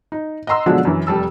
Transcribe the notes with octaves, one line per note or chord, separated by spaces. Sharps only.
D#4
D#5 F#5 A#5 C6 E6
B2 D3 F3 F#3 G#3 D4
F#2 E3
F1 G3 A5 E6